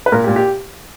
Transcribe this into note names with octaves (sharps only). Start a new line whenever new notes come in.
B4
A#2 A#4
G4
A#2
G4